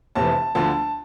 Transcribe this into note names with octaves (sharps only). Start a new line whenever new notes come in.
F1 F2 C3 E3 A5
D2 D3 F3 A5